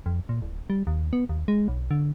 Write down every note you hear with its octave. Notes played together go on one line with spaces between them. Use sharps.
F2
A#2
D1
G3
D#2
B3
D#2
G#3
B1
D3